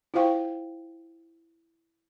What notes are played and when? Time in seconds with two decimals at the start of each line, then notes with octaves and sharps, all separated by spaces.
0.14 E4 F4 C5 F5 G5 C#6